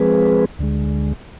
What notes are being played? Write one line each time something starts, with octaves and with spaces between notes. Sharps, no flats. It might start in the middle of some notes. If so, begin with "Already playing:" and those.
Already playing: F3 G#3 C4 G#4 B4
D2 D3 G#3